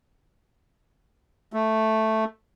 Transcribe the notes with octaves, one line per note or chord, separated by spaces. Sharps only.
A3